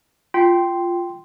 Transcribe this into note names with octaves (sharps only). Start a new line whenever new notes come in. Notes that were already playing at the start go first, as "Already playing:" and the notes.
F4 G5 C6